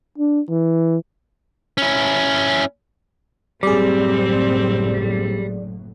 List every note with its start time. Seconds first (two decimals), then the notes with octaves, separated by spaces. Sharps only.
0.18 D4
0.49 E3
1.78 C#4 E4
3.63 F#1 A2 F#3 G3 C4 G#4 D5